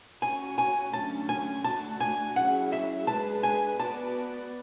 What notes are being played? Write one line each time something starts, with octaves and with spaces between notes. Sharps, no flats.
C#4 F#4 C#5 G#5
G#5
D3 F#3 A3 C#4 A5
G#5
A3 D4 F#4 A5
G#5
F#3 C#4 E4 G#4 F#5
E5
G#3 D4 G#4 B4 A5
G#5
B3 F#4 B4 D5 A5